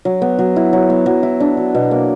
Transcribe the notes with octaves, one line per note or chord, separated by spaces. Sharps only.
F#3
B3
F#3
E4
F#3
B3
F#3
E4
D4
F#3
B2
A#3